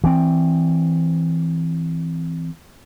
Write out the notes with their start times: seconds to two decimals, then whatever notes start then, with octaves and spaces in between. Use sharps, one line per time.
0.04 E3 C4